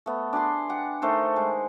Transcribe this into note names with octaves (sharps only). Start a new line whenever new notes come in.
A3 B3
D4 G#4 B5 C6
G4 F#5
D#3 A3 D#4 C5
G#3